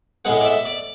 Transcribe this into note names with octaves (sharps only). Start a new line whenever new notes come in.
A2 G#3 B3 F#5
D5
E5
D5